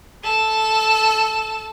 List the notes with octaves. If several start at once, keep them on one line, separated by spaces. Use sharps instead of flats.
A4 E7